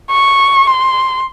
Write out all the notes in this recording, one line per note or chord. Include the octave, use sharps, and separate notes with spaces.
C#6
C6